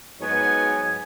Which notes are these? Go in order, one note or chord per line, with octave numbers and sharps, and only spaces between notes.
G#2 F#3 B3 G#5